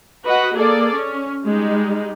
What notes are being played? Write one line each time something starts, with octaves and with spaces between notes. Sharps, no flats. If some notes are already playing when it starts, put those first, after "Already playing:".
F#4 B4 D#5 F#5
A#3 G#4 A4 D5
C#4
G3 G#3 D#4